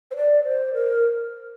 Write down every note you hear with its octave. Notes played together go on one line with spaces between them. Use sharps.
C5
D5
C5
A#4